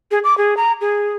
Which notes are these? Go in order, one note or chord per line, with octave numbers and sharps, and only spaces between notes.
G#4
D6
G#4
A#5
G#4